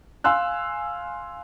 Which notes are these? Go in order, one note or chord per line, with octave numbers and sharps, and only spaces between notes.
F5 G#5 C6 E6 F#6